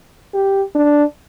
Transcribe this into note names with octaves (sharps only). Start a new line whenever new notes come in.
G4
D4